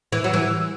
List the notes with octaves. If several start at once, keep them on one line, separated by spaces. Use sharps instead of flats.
E3
F#3
E3